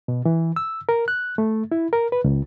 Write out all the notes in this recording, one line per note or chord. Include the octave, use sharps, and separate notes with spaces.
B2
E3
E6
A#4
F#6
A3
E4
A#4
B4
C#2